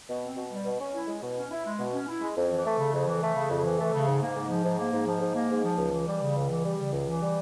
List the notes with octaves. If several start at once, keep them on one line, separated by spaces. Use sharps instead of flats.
B2
C4
B2
G3
B2
C#4
E4
G#3
B2
C#4
E4
G#3
B2
C#4
E4
G#3
F2
E3
A3
C#3
F2
E3
A3
C#3
F2
E3
A3
C#3
G#2
A#3
G#2
F3
G#2
A#3
G#2
F3
G#2
A#3
G#2
F3
C#2
E3
G3
C#3
C#2
E3
G3
C#3
C#2
E3
G3